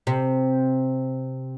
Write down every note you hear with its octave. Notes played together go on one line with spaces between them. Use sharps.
C3